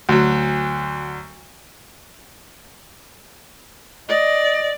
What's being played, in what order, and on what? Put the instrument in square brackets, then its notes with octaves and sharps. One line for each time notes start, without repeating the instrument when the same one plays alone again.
[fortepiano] D2 F#3
[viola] D5 [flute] D#5